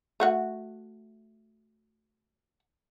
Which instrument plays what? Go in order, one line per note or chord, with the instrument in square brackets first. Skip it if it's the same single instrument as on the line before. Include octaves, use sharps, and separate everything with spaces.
[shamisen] A3 F#4 F#5